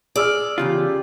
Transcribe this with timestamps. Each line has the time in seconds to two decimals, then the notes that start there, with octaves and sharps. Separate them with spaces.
0.16 G#4 D5 E6 F6
0.58 E2 C#3 F4 G4